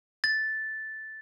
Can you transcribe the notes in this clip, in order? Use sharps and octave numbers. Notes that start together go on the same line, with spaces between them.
A6